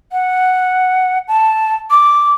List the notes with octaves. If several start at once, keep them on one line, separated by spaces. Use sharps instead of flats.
F#5
A5
D6